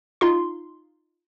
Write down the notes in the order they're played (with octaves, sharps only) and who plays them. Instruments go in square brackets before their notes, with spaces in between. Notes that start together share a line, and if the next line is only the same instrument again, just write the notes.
[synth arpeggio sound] D#4 F4 C6